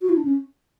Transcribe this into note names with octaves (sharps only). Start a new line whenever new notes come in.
F#4
E4
D4
C#4